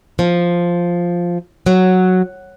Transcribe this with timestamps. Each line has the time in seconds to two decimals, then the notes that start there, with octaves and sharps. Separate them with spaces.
0.19 F3
1.66 F#3